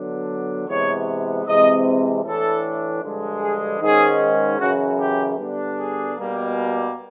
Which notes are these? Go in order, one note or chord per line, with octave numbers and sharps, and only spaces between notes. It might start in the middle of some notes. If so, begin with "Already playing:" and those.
Already playing: D3 F#3 B3 D4
C3 E3 G#3 B3 C#5
C3 E3 G#3 C4 D#5
A2 E3 A3 D4 A4
G2 D3 F3 G#3
G#4
G#2 D#3 G#3 C#4 G#4
F#2 C#3 E3 F#4
G4
D3 G3 B3 D4
G#4
B2 G3 A#3